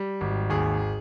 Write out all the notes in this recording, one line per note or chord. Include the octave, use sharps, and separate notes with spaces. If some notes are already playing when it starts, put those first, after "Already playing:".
Already playing: G3
G#1
D#2 G#4